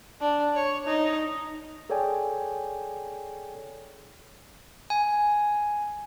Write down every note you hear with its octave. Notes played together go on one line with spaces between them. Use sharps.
D4
C#5
D#4
G#4 A4 C#5 D5 G5 G#5
G#5